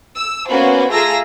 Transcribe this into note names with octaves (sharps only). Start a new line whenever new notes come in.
E6
A#3 B3 C#4 F#4 B4 C5
A3 F4 G#4 A#5 E6 A#6